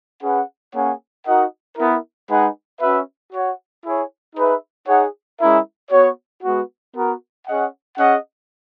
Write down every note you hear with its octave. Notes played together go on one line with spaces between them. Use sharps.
C#4 G#4 B4 F#5
A#3 C#4 G#4 C#5 F#5
D#4 F#4 A#4 D#5 F#5
B3 E4 A#4
G#3 D#4 G#4 B4 F#5
C#4 F#4 B4 E5
F#4 C#5 F#5
E4 G#4 C#5
D#4 G#4 B4 E5
D#4 G#4 C#5 F#5
G#3 C#4 E4 A#4 E5
B3 F#4 C#5
G#3 B3 F#4
B3 F#4 A#4
C#4 G#4 D#5 F#5
C#4 G#4 D#5 F#5